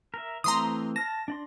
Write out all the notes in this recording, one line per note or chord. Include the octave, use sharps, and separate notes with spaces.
A#4 E5
E3 A3 C4 A#5 C6 D#6
A5 F6 A#6
D4 D5 C6